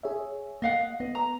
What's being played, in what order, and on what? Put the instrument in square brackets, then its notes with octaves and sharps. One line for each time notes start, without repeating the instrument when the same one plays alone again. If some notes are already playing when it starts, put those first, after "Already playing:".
[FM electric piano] G#4 C#5 E5
[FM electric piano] A#3 [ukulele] D#5 F5 F#5
[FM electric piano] B3 [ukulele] D#5
[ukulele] A#5